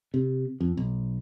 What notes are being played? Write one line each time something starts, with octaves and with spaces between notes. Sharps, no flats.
C3
F2
B1